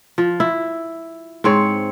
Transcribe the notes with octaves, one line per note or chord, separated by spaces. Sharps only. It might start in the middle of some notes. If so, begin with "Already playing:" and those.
F3
E4
G#2 C4 C#5